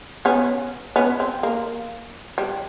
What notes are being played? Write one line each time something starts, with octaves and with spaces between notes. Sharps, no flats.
B3 C#4
B3 C#4
C4
A#3
G3